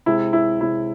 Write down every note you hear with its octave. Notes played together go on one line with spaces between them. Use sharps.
C3 G#3 E4
E4
C3 G#3 E4